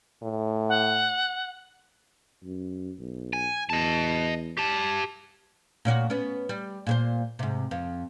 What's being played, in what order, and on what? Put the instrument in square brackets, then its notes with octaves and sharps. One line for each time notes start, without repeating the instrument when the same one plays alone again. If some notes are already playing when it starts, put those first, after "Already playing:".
[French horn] A2
[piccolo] F#5
[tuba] F#2
B1
[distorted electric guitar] G#5
[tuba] E2 [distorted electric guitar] D#5 A5
[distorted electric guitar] G4 A5
[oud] A#2 C#4 F#4
B3 C#4
G3
A#2 G#4 C5
G#2 C3
F2